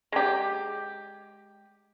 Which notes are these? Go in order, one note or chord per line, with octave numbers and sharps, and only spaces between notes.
G#3 G4